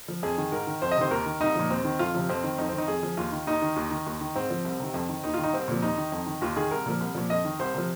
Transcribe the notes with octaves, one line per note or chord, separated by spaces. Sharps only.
F3
F2 G#4
D#3
G#2 A#4
D#3
F2 C5
D#5
C3 D#3 C5
D#2 A#4
D#3
C2 D#4
A#2 F3
D#2 C4
D#3
F2 F4
C3 F3
F2 C4
D#3
F2 D#4
D#3 C4
D#4
F2 G#4
F3
D#2 F4
D#3
D#2 D#4
D#3
D#2
D#3
D#2
D#3
G#2 C4
F3
C2
C3 D#3
F2
D#3
D#2 D#4
D#3 F4
D#4
C2 C4
A#2 F3
D#2 D#4
D#3
F2
D#3
D#2 F4
D#3 G#4
C2 A#4
A#2 F3
C2
A#2 F3
F2 D#5
D#3
C2 C5
C3 F3